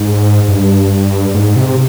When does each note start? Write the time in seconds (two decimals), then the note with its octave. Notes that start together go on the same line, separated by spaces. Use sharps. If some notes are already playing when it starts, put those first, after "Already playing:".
Already playing: G#2
0.48 G2
1.35 G#2
1.56 C3